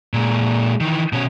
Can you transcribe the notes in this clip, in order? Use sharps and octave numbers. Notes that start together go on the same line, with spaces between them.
A#2 G#3
D#3 E3
B2 C#4